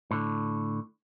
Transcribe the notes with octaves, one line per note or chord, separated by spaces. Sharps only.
A2 D3